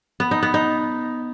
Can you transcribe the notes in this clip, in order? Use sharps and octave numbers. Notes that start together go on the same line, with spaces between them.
B3
D#4
B3
D#4